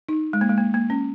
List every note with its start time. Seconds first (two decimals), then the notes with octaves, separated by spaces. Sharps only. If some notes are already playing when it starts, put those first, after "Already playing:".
0.09 D#4
0.33 G#3
0.41 A#3
0.49 G#3
0.58 A#3
0.74 A#3
0.90 C#4